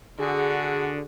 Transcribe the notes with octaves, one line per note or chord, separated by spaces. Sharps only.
D3 F#4 G#4